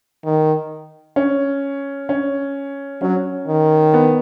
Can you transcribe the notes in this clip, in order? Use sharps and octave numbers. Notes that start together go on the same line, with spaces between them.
D#3
C#4
C#4
F#3 C#4
D#3
B3